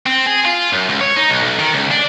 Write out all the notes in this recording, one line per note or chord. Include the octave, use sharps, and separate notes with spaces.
C4
G#4
F4
F#2
C#2
C#5
D#4
B1
B1
D#3
C#2
D4